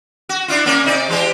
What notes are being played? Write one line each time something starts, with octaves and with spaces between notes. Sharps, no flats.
F#4
D4 E4 F4
A#3 C#4 A#4
C3 D#4 D5
E3 G#3 G4